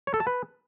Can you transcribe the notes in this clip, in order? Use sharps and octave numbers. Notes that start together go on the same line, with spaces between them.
C#5
A4
A5
B4